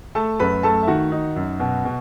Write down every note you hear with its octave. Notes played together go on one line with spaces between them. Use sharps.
A3 A4 A5
F#2 B4 B5
A3 A4 A5
E5
D#3 F#4 F#5
D#4
F#2
B2
B2